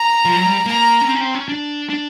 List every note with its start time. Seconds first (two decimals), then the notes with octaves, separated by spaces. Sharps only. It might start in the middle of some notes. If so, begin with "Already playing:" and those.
Already playing: A#5
0.25 F3
0.36 F#3
0.46 G3
0.66 A#3 A#5
1.01 C#4
1.07 C4
1.14 C#4
1.21 C4
1.35 C#4
1.48 D4
1.90 D4